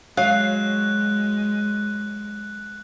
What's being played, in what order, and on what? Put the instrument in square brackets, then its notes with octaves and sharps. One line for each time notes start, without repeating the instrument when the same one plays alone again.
[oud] F#3 [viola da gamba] G#3 [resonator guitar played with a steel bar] F5 [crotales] F#6